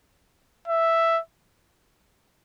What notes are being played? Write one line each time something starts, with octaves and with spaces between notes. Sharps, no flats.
E5